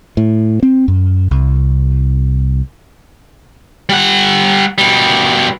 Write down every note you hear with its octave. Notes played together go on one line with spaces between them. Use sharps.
A2
C4
F#2
C2
G3 F#5
B2 G3